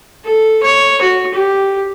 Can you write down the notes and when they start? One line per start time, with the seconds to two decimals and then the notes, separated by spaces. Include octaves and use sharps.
0.24 A4
0.63 C#5
1.01 F#4
1.34 G4